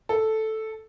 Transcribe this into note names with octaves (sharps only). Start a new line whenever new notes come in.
A4